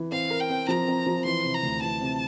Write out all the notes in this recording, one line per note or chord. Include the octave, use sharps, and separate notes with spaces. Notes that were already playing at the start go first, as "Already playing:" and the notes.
Already playing: E3
C4 F5
A#4
G5
C4
F3 A#5
C4
F3
E3 C6
C3
A#5
D2
E3 A5
C3